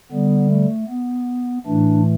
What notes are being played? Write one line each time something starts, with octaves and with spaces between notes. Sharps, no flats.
D3 G3 B3
A3
B3
A2 E3 A3 D4